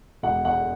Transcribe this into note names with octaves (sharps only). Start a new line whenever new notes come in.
E1 F#5
E2 F#5